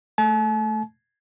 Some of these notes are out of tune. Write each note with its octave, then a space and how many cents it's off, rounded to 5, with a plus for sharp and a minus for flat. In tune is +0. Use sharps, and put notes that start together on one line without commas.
A3 -5 A5 -45